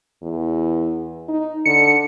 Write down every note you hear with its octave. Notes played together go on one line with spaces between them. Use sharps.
E2
D#4
D3 C#7